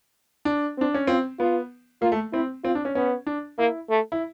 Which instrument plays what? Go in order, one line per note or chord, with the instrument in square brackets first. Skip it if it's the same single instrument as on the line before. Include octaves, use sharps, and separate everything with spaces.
[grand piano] D4
[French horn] C4 [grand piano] D4
[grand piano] C#4
[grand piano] C4 [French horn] F4
[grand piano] B3 [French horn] F4
[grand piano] A#3 [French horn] F4
[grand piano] A3
[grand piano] C4 [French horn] E4
[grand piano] C4 [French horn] F4
[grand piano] D4
C#4
[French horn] B3 [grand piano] C#4
[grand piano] D4
[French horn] A#3 [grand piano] E4
[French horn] A3
[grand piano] E4